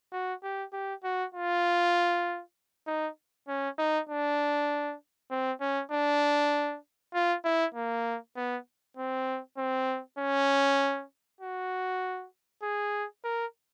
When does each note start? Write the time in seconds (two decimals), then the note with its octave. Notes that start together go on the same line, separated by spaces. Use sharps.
0.12 F#4
0.43 G4
0.73 G4
1.04 F#4
1.35 F4
2.87 D#4
3.48 C#4
3.78 D#4
4.09 D4
5.31 C4
5.61 C#4
5.92 D4
7.14 F4
7.44 E4
7.74 A#3
8.36 B3
8.97 C4
9.58 C4
10.19 C#4
11.41 F#4
12.63 G#4
13.24 A#4